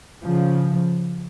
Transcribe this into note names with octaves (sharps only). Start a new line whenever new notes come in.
C#3 F3